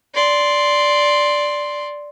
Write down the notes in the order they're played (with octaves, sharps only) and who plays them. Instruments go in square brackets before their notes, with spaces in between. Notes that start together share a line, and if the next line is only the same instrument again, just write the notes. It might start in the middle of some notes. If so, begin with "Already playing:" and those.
[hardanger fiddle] D5 C6